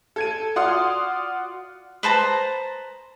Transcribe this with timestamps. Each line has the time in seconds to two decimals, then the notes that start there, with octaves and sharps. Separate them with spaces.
0.16 A4 G#6 D#7
0.56 F4 F#4 D5 F#5 C6 D#6
2.03 B4 C5 A5 A#5